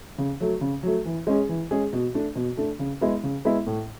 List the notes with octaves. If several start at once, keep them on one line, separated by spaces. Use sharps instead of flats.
C#3
F#3 A3
C#3
F#3 A3
E3
G#3 C#4 G#4
E3
G#3 C#4 G#4
B2
A3 D4
B2
A3 D4
C#3
G#3 B3 E4
C#3
G#3 B3 E4
A2